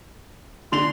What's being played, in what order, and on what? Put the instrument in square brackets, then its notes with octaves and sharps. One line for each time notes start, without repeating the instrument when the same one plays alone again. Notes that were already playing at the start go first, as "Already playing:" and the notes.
[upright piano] D3 F7 [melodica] C6